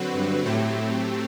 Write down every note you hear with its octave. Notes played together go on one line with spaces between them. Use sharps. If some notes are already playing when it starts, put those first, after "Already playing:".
Already playing: D3 F#3 C4 F#4 B4
G2
A2 F#3 A3 C4 G4